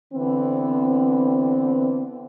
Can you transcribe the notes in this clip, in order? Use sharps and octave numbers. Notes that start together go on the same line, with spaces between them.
D3 E3 B3 C4